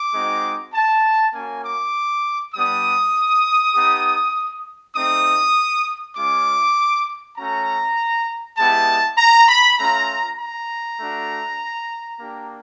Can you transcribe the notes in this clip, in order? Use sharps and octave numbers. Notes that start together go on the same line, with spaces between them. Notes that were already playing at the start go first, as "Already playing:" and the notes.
Already playing: D6
G#3 C4 D#4 F#4
A5
A#3 C#4 F#4 G#5
D6
G3 B3 D4 D#6
B3 D#4 G4
A3 C4 D#4 D#6
G#3 C#4 F4 D6
A3 C#4 F#4 A#5
G#3 B3 E4 G4 A5
A#5
B5
A3 C#4 F4 A#5
A#5
A3 D4 F#4
A#3 D4 G4